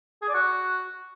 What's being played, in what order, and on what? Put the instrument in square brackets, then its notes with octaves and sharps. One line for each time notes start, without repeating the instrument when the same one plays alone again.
[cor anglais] G#4
D5
F#4